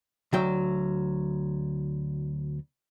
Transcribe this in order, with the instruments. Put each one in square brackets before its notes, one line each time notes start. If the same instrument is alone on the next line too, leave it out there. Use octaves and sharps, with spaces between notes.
[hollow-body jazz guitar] D2 F#3 G5